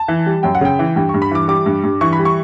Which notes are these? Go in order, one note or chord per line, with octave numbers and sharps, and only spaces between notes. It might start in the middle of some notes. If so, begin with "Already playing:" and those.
Already playing: A5
E3
G3
F#2 G5
F#5
C#3 G5
E3
G2 G5
C#6
G2
B5
E3 D6
G3 D6
G2
G2
E3 C#6
B5
G3
C#6